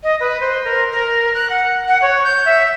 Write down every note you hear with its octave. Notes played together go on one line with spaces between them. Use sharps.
D#5
B4
C5
A#4
A#4
F#6
F#5
F#5
C#5
G6
E5